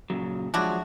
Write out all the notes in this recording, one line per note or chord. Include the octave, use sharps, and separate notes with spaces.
A#2 C#3 F#3
F3 F#3 G#3 D4 E4 F#4